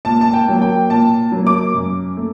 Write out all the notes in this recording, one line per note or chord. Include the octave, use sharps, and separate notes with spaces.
A#2 A5
A5
G5
F#3 A#3
G5
A#2 A5
F#3 A#3
D6
F#2
A3